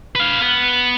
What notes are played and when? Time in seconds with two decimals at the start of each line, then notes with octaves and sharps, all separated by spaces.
0.15 B4 F5
0.41 B3